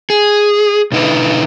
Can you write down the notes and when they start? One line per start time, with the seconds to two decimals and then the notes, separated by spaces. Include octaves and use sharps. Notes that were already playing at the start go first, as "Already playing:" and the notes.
0.10 G#4
0.92 B2 D3 D#4 E4 B4